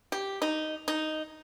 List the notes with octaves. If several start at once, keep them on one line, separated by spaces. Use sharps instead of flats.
G4
D#4
D#4